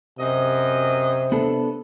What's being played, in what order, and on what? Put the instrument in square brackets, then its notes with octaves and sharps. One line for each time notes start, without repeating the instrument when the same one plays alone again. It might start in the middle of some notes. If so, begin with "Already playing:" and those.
[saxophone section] F#2 D#5 [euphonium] C3
[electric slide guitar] B3 D4 A4